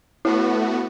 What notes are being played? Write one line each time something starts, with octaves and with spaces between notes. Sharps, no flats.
A3 B3 E4 F#4